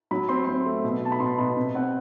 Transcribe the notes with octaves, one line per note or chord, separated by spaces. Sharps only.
F#3 B5
C4 C6
C4 C6
A3
B2
B2 A5
B5
B2 C6
B2 B5
C3
C4 F#5